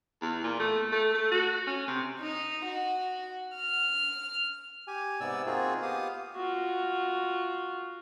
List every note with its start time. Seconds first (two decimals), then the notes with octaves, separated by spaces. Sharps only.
0.22 E2
0.44 A#2
0.60 A3
0.92 A3
1.14 A3
1.32 F#4
1.67 C#4
1.88 C3
2.20 D#4
2.65 F#4
3.56 F6
4.88 G4 G#5
5.21 G#2 C3 B3 D5 E6
5.46 A#3 C4 D#4 F4 F#4 G#4
5.82 B3 G4 F5 D#6
6.36 F4 F#4